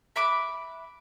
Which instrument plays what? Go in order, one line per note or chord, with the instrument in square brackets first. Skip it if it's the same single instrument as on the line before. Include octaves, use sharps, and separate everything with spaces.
[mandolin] E5 B5 D6 F#6